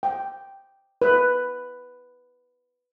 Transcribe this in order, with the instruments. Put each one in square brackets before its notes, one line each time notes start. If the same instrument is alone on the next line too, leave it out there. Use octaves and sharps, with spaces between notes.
[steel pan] G5
B4